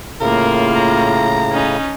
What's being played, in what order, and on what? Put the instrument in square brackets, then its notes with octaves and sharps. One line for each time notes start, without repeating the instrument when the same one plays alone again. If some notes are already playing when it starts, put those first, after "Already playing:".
[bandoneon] A2 C#3 [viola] A#3 F4 [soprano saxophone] A#4
[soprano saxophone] A#5
[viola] C#4 D#4